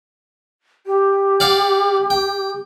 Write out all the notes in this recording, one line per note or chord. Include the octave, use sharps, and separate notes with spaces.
G4
D5 F5 F#5
G5